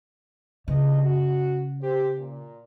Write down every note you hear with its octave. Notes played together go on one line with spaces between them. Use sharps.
G2 C#3 E3 D#5
F#4
G4 C5
A#2